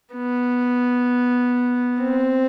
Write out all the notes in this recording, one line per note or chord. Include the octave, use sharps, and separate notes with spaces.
B3
C4